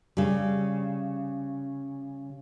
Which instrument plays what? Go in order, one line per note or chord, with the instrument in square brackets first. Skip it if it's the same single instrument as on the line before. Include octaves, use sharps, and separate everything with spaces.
[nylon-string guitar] C#3 G3